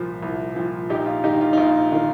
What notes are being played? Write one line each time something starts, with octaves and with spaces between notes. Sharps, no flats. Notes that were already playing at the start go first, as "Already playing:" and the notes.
Already playing: C2 A#2 F3
C2
A#2 F3
A#1 D#4 G4
F4
G#2 D#3 D#4 G4
F4
D#4
A#1 F4
D#3 F4